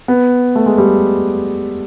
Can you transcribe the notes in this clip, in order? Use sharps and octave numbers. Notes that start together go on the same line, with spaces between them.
B3
A3
G#3
G3